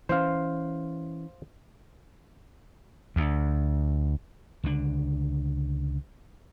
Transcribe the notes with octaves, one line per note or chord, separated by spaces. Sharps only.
E3 C4 C#4 C5 F5
D2
C#2 D3 D4